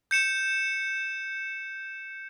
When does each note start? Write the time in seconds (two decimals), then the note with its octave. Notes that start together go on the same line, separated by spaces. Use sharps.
0.11 G6 C#7 E7